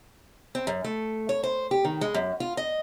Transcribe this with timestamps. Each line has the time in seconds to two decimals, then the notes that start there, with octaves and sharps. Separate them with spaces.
0.55 C4
0.67 F#2
0.84 A3
1.29 C#5
1.43 C5
1.71 G4
1.85 D#3
2.01 G#3
2.14 F#2
2.40 F4
2.57 D#5